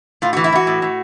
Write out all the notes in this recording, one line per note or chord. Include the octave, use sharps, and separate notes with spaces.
A2 F4
E3 F#4
E4
E3 F#4
A2
A2